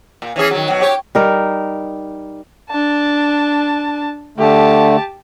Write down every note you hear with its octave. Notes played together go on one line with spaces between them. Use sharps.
A#2
E3 C#4 G#4
D#3 F#3
B2 F#3
G4 C#5
G3 D#4 A#4
D4 A5
D3 A3 G4 A5